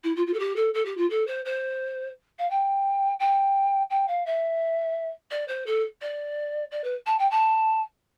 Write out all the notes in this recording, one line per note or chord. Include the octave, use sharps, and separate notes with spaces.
E4
F4
F4
A4
G4
A4
A4
G4
F4
A4
C5
C5
F5
G5
G5
G5
F5
E5
D5
C5
A4
D5
D5
B4
A5
G5
A5